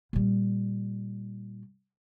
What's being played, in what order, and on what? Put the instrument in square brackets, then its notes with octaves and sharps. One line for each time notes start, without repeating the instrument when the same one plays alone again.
[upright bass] A#2 G3